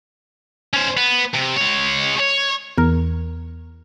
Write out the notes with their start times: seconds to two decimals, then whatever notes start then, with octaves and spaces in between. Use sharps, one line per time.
0.74 C#4 C5
0.97 B3
1.34 C3
1.57 G#3 C#5
2.20 C#5
2.78 E2 A#4